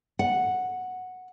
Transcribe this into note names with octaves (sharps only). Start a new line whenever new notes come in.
F#5